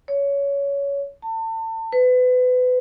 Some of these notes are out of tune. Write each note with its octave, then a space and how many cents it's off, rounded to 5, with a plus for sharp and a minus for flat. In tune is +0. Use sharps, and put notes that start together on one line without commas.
C#5 +15
A5 +35
B4 +30